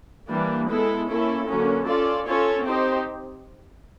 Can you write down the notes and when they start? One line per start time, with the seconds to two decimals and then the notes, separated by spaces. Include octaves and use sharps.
0.30 E3 G3 A#3 D4
0.69 G#3 B3 E4 A4
1.08 A#3 C#4 E4 A4
1.47 D3 F#3 A#3 C#4
1.87 C#4 F4 A4 D5
2.27 C#4 F4 A4 C#5
2.65 C4 D#4 G4 C5